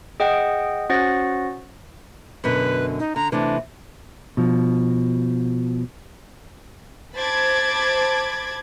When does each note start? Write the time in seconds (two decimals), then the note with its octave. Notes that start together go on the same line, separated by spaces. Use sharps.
0.20 G#4 D#5 F#5 G5
0.90 C#4 F#4 C5 F#5 A6 A#6
2.44 F#2 B2 D3 B4
2.99 D#4
3.16 D3 A#5
3.32 C3 E3 A3 D4
4.37 B2 F3
7.17 C5 A5 B5 D6 G#6 A6